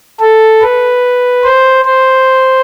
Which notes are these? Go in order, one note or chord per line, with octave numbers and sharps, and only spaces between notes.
A4
B4
C5
C5